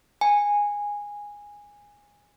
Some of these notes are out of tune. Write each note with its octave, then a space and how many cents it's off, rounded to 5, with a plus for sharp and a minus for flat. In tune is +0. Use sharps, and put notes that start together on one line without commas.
G#5 -10